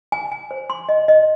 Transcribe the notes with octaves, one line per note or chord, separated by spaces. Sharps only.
G#5
G#5
C5
C6
D#5
D#5